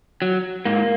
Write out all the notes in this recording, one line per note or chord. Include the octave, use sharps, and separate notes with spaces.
F#3
G#2 A#3